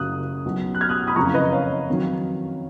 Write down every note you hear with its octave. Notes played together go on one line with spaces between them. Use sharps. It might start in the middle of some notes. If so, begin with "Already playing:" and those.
Already playing: F#1 F#2 C#3 F#3 D#6 F#6
B1 B2 F#3
F#6
F6 G#6
D#6 F#6
B5 D#6
F#1 F2 C#3 F3 A#5 C#6
B4 D#5
C#5 F5
F2 D#3 F#3